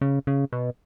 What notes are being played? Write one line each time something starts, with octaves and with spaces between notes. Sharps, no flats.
C#3
C#3
B2